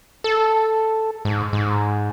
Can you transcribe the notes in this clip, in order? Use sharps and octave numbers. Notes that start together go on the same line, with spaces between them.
A4
G#2
G#2